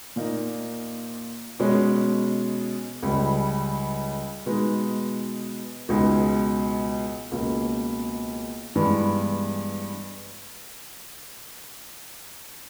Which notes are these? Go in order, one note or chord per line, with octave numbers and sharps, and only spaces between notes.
A#2 A#3 D#4
B2 G#3 C#4
C#2 C#3 G3
B2 G#3 B3 D#4
C#2 B2 G#3 D#4
C#2 B2 A#3
G2 E3 G#3 B3